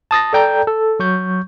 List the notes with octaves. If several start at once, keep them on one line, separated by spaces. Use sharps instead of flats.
A5 D#6 A6 A#6
A4 D5 G5 A#5 G6
A4
F#3 C#6 G6